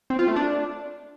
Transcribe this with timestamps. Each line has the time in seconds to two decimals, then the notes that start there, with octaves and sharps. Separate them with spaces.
0.10 C4
0.19 F4
0.28 A3
0.36 D4